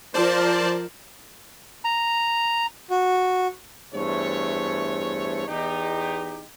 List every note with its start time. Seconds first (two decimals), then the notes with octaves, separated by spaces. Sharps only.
0.14 F3 A#4 C5 D5 A5
1.85 A#5
2.90 F#4
3.94 E2 G2 A3 C5 C#5
5.48 E2 D#4 G4